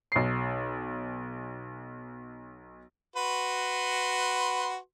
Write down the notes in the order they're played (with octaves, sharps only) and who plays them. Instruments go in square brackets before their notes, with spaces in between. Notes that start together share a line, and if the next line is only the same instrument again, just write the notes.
[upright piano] B1 C7
[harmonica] F#4 B4 C6